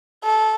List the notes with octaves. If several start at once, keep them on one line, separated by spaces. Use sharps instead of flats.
A4